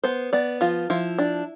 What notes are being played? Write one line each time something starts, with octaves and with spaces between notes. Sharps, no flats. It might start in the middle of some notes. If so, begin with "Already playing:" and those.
B3 C5
B3 D5
F3 F4
F3 E4
D4